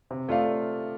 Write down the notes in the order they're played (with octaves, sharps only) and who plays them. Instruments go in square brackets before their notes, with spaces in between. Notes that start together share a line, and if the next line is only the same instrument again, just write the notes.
[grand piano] C3
A3 F4 D5 F5